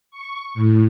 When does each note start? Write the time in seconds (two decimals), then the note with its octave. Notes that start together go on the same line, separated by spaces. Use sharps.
0.11 C#6
0.54 A2